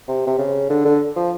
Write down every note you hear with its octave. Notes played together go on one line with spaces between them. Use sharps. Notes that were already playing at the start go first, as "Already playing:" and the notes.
C3
C3
C#3
D3
D3
F3